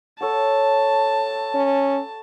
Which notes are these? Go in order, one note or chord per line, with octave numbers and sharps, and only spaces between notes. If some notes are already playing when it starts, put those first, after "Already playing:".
A4 C#5 F#5 A5
C#4